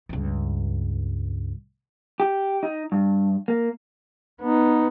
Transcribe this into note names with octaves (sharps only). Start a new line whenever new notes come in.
C#2 G2
G4
D#4
G2
A#3
B3 D#4